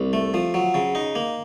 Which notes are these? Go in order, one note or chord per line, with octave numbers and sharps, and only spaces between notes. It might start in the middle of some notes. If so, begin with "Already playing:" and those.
Already playing: C2
A3
F3
F#3
C#3
D#4
A#3